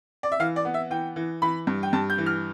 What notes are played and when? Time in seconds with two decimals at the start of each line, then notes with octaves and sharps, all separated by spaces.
0.23 D5
0.32 E5
0.40 E3 F5
0.56 D5
0.65 B3
0.74 E5
0.90 E3 G5
1.16 E3
1.42 E3 B5
1.67 G2
1.83 G5
1.93 G2 A5
2.10 G6
2.18 E3
2.26 F6